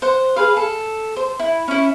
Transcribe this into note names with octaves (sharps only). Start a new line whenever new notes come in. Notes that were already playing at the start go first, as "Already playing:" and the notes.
C5 F#5
G#4 B4 F5
A4
C5
E4
C#4 E4